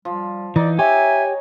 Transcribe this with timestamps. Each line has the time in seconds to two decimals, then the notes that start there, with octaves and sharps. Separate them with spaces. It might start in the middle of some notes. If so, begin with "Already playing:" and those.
0.05 F3 G3
0.56 E3 D#4 D5
0.79 G4 C#5 E5 G#5